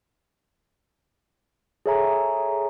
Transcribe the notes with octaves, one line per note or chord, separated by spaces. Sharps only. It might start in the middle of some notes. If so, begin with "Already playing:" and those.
G#4 A4 C#5 E5 G#5 A#5